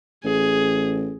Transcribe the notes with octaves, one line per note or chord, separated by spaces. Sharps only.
A1 G#4